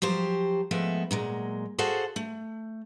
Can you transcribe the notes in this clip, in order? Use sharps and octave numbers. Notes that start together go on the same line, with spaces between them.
F3 F#3 G4 C5
F3 G#3 A3 B3 E5
A#2 F#3 G#3
F#4 G#4 A4 C5 F5 F#5
A3